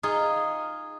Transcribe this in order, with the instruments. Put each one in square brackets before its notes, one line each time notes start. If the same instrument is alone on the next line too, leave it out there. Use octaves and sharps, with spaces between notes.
[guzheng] D#4 F4 G#4